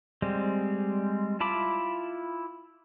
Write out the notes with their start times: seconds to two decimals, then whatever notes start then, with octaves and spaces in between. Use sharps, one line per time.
0.22 G3 G#3 C4
1.40 E4 F4 A5 B5 D6